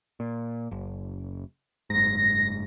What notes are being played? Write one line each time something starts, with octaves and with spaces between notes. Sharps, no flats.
A#2
F#1
F#1 G#2 A#6